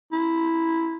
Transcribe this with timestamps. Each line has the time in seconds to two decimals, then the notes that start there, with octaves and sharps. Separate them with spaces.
0.13 E4